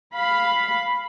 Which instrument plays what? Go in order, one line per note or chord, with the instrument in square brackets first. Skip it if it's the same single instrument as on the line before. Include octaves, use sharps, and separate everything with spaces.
[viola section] F5 B5